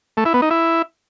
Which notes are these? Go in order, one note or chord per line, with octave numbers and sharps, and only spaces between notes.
A3
E4
B3
D#4
E4